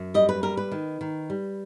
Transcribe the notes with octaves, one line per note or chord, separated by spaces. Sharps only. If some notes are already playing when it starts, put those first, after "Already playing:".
Already playing: F#2
G3 D#5
B4
G3 A#4
B4
D#3
D#3
G3